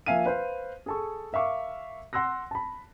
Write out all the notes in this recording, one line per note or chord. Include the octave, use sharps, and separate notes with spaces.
F3 A#3 E5 F5 G#5 D#7
B4 C5 F5
G#4 A4 C#6
A#4 E5 F5 C#6 D6
F#5 C6 E6 F#6 A#6
A5 B5